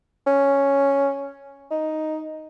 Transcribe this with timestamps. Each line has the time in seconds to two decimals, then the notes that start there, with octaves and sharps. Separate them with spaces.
0.27 C#4
1.71 D#4